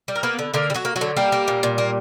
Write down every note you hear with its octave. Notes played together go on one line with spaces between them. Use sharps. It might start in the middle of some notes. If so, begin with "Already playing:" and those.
G3
A#4
A#3 B3 B4
D3
D3 A#3 A#4
G3
F#3 F#4
A#3
F#3 F#4
D3
G3 A#3 G4
A#3
A#2
A#2
A#3